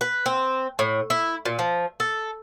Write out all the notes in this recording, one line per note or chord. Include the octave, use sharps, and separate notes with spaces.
B4
C4
A2
E4
A#2
F3
A4